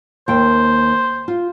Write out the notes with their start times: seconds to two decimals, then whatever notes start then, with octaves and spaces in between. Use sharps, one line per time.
0.28 D#2 C5 G5
1.28 F4